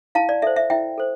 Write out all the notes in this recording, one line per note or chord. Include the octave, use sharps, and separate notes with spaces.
E4 F5 A5
D5
A4 C5 E5
E5
E4 E5 G5
A4 C5